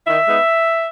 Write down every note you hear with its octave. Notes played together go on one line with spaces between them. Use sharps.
D#3 E5
G#3 B3 D#4